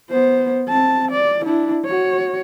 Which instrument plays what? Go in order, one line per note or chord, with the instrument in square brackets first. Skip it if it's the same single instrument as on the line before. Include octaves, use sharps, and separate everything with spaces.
[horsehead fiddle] B3 C5
C4 A5
D5
D4 E4
F#4 C#5